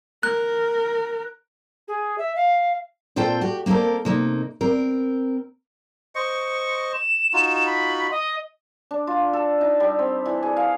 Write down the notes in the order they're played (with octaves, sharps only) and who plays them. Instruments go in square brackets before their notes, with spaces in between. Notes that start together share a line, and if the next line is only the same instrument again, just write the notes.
[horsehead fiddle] A#4 [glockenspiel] F#6
[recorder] G#4
E5
F5
[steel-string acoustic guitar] A#2 C4 F4 A4 C5 G5
F#4 G4
A#3 C4 E4 A4 A#4
C3 A#3 D#4
C4 A#4
[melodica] C5 D#5 C#6 [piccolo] C#7
[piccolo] E7
[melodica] D#4 F4 F#4
[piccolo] B5
D#5
[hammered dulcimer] D4
F4
A4
D#4
G3
C4
E3
G#4
F5